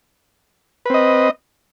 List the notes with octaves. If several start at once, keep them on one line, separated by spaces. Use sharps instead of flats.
C4 B4 D#5